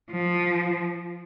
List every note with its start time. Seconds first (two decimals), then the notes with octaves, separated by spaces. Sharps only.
0.11 F3